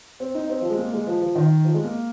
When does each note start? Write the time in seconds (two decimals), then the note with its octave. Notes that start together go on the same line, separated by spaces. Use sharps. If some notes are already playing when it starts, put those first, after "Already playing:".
0.20 C4
0.35 D#4
0.50 C4
0.61 F3
0.70 G#3
0.78 A#3
0.93 G#3
1.07 F3
1.22 F3
1.35 D#3
1.64 F3
1.74 G#3
1.84 A#3